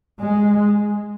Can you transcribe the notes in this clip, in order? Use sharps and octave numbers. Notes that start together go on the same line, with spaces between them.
G#3